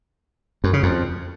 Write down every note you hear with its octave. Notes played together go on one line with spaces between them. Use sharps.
F#2
C#3
F2